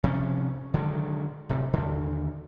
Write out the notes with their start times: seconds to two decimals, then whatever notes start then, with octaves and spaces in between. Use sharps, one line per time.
0.04 C3 F3 G3 C#4
0.74 D3 D#3 F#3 G#3
1.49 D1 C3
1.73 D#2 D3